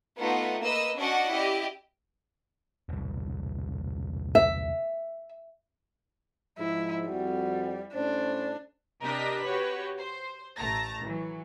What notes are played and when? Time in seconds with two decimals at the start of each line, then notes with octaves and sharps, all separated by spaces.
0.18 A3 B3 D#4 F4 F#5
0.61 A#3 B4 D#5 E6
0.98 C#4 D4 F#4 D5 D#5 F#5
1.29 E4 G4 D5 D#5
2.89 E1 C2
4.35 E5
6.58 G#2 F3 E4
7.09 F2 G3 F#4
7.94 A2 C#4 D4 C5
9.02 C3 D4 G4 A#4 D#5 B6
9.44 F#4 G4 B4 C#5
9.98 C5
10.59 A1 A3 A5 A#5 A#6
11.02 E3 F#3